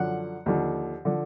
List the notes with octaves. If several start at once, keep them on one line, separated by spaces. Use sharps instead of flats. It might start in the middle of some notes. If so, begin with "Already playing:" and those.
Already playing: F#2 D3 F3 F#5
D#2 D3 F3
D3 F3